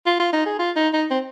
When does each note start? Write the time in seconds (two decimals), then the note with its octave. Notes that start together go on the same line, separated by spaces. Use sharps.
0.06 F4
0.20 F4
0.33 D#4
0.46 G#4
0.59 F4
0.76 D#4
0.93 D#4
1.11 C4